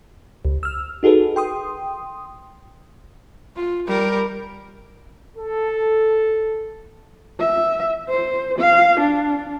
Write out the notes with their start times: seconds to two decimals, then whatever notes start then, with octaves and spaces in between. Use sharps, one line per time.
0.45 C#2
0.63 E6 F6
1.03 D#4 F#4 G#4 A4 B4
1.36 G5 C6 D#6
3.56 F4
3.87 G3 A#4
5.37 A4
7.40 E5
8.10 C5
8.59 F5
9.01 D4